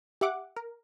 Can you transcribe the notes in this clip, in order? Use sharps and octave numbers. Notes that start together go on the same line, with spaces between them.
G4 E5 F#5 D6
A#4